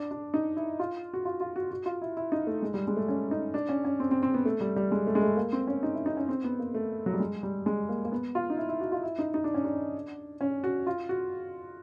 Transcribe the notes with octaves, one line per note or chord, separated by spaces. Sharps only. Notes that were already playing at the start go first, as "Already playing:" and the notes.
Already playing: D4
D4
D#4
E4
F4
F#4
F4
F4
F#4
F#4
F4
E4
E4
D#4
A3
G#3
G3
G#3
A3
C#4
D#4
D4
C#4
C#4
C4
C4
C4
B3
A3
G3
G3
G#3
A3
G#3
A3
A#3
C4
C#4
D#4
E4
D#4
C#4
C4
B3
A#3
A3
F#3
G3
G#3
G3
G#3
A#3
A#3
B3
F4
D#4
E4
E4
F#4
F4
E4
D#4
D#4
D4
C#4
D4
C#4
F#4
F4
F#4